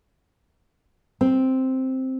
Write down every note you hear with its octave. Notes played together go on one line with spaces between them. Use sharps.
C4